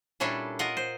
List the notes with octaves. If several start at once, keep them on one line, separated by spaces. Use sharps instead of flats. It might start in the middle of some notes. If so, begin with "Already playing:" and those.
A#2 G3 C#4 D4 E4 A4
F4 A#4 D#5 F#5
C5